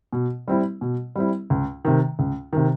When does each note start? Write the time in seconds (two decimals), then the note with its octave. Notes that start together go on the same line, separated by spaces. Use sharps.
0.13 B2
0.48 G3 C4 E4
0.81 B2
1.16 G3 C4 E4
1.50 C#2
1.85 C3 D#3
2.19 C#2
2.53 C3 D#3